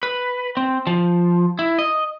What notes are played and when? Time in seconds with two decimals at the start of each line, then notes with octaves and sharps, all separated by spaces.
0.03 B4
0.57 C4
0.87 F3
1.59 E4
1.79 D#5